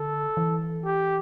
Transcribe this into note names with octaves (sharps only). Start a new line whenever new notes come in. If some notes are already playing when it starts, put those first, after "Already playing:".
Already playing: D3 A4
E3
G4